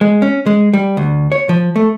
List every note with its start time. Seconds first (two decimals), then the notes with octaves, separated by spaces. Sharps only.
0.01 G#3
0.22 C#4
0.46 G#3
0.73 G3
0.97 D2
1.32 C#5
1.49 F3
1.76 A3